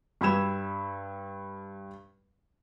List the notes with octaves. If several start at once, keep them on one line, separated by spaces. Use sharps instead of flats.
G2 B5 E6 G#6 E7